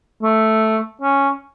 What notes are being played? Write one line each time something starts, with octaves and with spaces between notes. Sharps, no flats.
A3
C#4